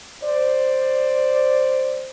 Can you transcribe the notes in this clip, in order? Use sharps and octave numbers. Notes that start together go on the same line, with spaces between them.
C5 D5